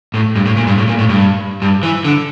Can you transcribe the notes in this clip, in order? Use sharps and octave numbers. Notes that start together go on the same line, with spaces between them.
A2
G2
A2
A#2
G2
A2
A#2
A2
G2
G2
E3
D3